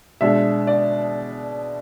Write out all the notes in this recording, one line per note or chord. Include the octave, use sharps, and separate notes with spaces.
B2 G#3 D4 E5
D5